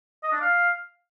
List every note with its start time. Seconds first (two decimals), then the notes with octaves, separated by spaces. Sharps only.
0.23 D#5
0.32 D4
0.41 F5